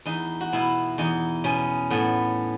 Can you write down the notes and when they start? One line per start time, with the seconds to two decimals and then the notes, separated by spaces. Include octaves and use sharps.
0.06 E2 D#4
0.41 F#4
0.53 B2 E4
0.98 E2 D#4
1.44 B2 C#4
1.90 A2 B3